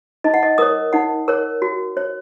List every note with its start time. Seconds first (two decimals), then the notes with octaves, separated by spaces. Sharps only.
0.24 D#4 D#5
0.34 F#5
0.43 D#5
0.58 A#4 C#5 D#6
0.93 D#4 F#5
1.28 A#4 C#5
1.62 F#4
1.97 C#5